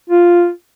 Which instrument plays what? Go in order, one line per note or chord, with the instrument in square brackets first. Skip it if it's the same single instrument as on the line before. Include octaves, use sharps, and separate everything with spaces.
[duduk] F4